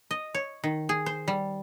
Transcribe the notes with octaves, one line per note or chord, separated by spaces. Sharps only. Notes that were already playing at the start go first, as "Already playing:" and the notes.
D#5
C#5
D#3
G#4
C5
G3